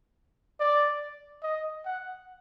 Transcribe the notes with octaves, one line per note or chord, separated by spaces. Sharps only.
D5
D#5
F#5